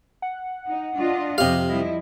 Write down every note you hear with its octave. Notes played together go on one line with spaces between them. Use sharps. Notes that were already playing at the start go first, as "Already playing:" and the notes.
F#5
D#4
D4 F4 D#5
F2 C3 G4 D#5 F5
F3 G3 E4 D#5